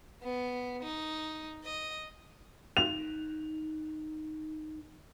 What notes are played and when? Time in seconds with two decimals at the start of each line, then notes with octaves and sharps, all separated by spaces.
0.23 B3
0.83 D#4
1.64 D#5
2.77 D#4 F7